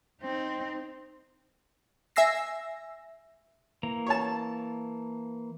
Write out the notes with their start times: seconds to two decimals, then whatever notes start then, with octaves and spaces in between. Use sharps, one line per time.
0.22 C4 D#4
2.16 E5 G#5 E6 A#6 C7
3.83 E3 A#3 A#5
4.07 C#5 A5